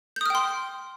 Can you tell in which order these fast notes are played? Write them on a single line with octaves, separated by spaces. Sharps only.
G6 D#6 F6 G5 C6